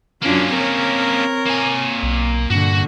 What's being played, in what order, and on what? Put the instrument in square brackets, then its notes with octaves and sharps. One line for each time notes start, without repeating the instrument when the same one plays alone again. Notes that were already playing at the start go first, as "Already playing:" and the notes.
[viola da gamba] F#2 D4 F4 [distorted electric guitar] A#3 C#4
[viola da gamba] C4 A#4 C#5
[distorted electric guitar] A#3 G#5
[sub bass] B1
[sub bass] G2 [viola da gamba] A#2 D3 [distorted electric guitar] F#4